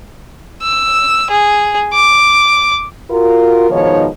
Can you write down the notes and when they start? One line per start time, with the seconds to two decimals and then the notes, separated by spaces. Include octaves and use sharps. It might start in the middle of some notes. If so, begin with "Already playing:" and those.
0.62 E6
1.31 G#4
1.94 D6
3.10 F4 F#4 A#4
3.70 G#2 B2 D#3 F3 D#4 C#5